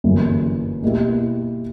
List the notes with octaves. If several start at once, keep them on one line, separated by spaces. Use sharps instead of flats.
G1 F#2 E3 A#3 C#4
B2 A#3 E4 G4